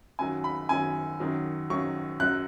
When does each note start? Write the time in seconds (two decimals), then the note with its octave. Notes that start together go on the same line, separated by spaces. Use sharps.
0.19 F#2 D#3 F#3 G#5
0.44 B5
0.69 F#2 D#3 F#3 G#5
1.20 F#2 D#3 F#3
1.70 F#2 D#3 F#3 C#6
2.20 F#2 F#3 F#6